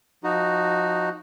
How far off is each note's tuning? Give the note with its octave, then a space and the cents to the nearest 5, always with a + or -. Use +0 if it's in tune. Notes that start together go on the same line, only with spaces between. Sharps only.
F3 +20 D#4 +0 F#4 +0